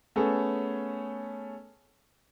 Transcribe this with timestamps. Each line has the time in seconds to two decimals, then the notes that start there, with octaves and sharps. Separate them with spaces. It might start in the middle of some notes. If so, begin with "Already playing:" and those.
0.16 A3 B3 C#4 G#4 A4